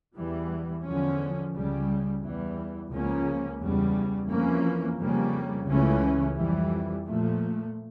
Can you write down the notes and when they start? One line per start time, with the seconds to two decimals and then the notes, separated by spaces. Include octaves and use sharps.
0.15 E2 E3 G3
0.84 E2 D3 F3 C#4
1.53 C#2 C#3 G3
2.22 E2 E3 G3
2.91 C#2 C#3 F3 A#3 C#4
3.60 E2 C#3 G3
4.29 F2 E3 A#3 C#4
4.97 F2 C#3 G3 A#3 C#4
5.67 C#2 C#3 E3 A3 C#4
6.36 F2 E3 G3
7.05 A#2 F3 A3